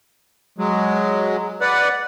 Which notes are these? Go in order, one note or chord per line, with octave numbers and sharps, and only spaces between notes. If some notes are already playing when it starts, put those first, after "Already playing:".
F#3 G#3
B4 D5 F#5